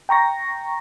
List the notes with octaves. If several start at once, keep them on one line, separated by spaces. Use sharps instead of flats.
G5 A#5 C#6 A#6